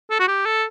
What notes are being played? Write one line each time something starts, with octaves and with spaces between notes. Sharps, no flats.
A4
F#4
G4
A4